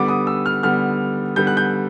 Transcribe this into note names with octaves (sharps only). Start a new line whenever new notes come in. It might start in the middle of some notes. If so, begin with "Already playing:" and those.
Already playing: D3 G3 B3 D6
D#6
E6
F6
D3 G3 B3 F6
D3 G3 B3 G6
F#6
G6